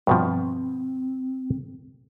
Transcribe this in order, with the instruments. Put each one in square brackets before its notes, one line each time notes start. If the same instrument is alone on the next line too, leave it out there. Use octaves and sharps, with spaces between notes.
[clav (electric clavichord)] G2 B2 F3 [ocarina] C4